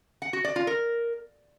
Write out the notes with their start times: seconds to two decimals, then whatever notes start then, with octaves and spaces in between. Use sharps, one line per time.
0.22 F#5
0.33 F#4
0.44 D5
0.56 F4
0.67 A#4